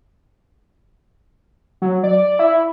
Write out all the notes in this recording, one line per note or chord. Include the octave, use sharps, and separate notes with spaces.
F#3
D5
E4